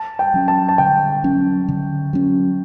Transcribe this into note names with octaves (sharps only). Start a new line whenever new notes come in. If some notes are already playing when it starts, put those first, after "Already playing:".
Already playing: A5
G5
F#3 C#4
A5
A5
D3 G5
F#3 C#4
D3
F#3 C#4